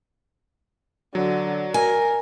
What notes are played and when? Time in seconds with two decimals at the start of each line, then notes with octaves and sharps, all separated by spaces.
1.15 D3 F#3
1.74 A#4 G#5